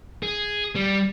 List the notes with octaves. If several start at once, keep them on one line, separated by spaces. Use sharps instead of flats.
G#4
G3